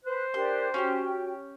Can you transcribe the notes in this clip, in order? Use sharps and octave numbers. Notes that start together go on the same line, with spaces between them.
B4 C5 F#6
D4 G4 A#4 C6 F#6
C#4 E4 F#4 G4 G5